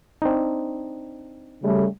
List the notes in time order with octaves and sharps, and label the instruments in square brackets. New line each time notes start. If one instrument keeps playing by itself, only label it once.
[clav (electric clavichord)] C4 D4 D#4
[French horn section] C#3 G3 A3